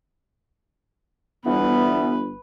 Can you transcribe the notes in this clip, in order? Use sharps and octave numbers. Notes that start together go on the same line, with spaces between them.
G1 E3 G3 B3 B4